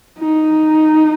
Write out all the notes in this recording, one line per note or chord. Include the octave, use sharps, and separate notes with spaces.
D#4